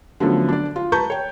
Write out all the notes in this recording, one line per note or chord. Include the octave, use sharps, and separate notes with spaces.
D3 F3 F#3 A3 B3 C#4
D4 D5
F4
B4 A5 A#5 C#6 G6
C#5 G5